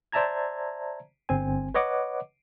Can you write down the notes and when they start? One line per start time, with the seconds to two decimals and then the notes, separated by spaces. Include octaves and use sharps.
0.12 C5 D5 E5 A5 A#5 G#6
1.29 G1 C4 G#5
1.74 B4 C#5 D#5 F#5 D6